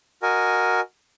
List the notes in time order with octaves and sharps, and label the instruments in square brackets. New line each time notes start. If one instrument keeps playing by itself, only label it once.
[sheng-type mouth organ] F#4 A#4 D#5 G#5